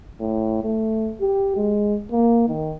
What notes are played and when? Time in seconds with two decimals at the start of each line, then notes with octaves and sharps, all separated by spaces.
0.20 A2
0.63 A3
1.21 G4
1.57 G#3
2.12 A#3
2.48 D#3